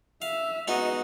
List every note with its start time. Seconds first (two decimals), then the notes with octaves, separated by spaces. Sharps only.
0.22 E5 F5
0.68 G#3 B3 D#4 F#4 D#5